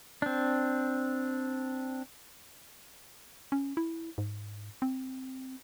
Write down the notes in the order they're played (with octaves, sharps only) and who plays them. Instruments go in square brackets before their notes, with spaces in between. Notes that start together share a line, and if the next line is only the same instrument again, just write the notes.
[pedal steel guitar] C4 D4
[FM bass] C#4
E4
G#2
C4